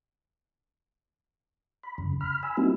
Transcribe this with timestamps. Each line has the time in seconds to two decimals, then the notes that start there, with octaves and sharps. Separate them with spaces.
1.83 B5
1.98 F#2 C#3
2.21 B5 F6
2.43 G#5 B5 E6
2.57 G3 A#3 C4 D#4 E4 F#4